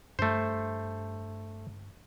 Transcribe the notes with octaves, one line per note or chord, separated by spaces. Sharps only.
G2 A3 C5